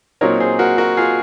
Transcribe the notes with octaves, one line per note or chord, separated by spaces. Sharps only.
A#2 F#3 C4 D#4 A#4 C#5
G#4 C5
F#4 A#4
F#4 A#4
F4 G#4